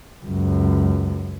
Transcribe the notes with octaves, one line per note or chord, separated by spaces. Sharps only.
C#2 F#2